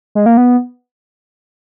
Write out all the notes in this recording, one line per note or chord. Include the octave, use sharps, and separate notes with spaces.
G#3
A#3
B3